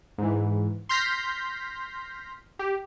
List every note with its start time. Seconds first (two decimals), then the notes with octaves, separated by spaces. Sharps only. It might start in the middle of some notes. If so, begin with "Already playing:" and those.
0.18 G#2 E3
0.89 C6 F6 G6 A#6 B6
2.59 G4